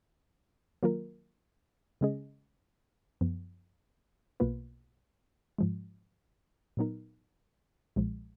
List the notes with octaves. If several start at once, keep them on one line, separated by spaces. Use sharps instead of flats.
D#3 F#3 A#3 F4 A#4
C#3 G#3 C#4 G#4 D#5
F#2 F3 B3
B1 B2 A#3 F4 B4
G#2 F3 G#3
A#2 F#3 B3 D#4 A#4
B1 A#2 F3 G#3